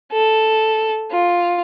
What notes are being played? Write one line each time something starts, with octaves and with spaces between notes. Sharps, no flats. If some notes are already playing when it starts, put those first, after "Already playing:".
A4
F4